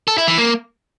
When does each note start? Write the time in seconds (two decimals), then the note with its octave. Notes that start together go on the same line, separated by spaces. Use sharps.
0.08 A4
0.18 E4
0.28 E3
0.38 A#3